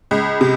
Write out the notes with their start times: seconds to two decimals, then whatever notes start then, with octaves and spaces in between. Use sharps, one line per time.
0.11 C#2
0.41 C3